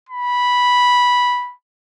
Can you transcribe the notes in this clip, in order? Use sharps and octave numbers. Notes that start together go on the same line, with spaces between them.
B5